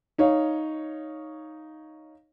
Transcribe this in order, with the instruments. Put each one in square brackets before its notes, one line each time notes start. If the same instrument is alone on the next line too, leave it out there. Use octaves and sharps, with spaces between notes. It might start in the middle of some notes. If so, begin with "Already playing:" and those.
[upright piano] D#4 C#5 F5